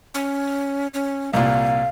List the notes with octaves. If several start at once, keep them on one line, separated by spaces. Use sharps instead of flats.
C#4
C#4
C2 A#2 F5